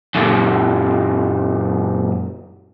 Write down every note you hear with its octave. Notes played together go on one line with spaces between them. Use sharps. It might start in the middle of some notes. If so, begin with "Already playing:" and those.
F#2 A#2